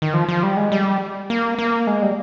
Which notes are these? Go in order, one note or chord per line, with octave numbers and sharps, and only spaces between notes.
D#3
F3
F3
G3
G#3
G3
A#3
A#3
G#3
G3